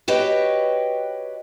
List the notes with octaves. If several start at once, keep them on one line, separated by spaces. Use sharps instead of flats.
F#4 G4 B4 C#5 D#5 G5